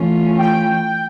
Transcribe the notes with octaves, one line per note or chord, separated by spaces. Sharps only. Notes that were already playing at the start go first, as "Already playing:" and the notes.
Already playing: E3 A3 C#4 F4
G5